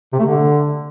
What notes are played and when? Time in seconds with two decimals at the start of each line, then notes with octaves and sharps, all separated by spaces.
0.13 C3
0.19 A3
0.25 D3